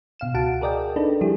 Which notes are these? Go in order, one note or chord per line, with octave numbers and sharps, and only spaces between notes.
B2 F5 E7
C#2 F#4 F#5 A5 D7
G#4 A#4 D5 D#5 G5
D4 D#4 A4 B4
F3 G3 E4 G4 G#4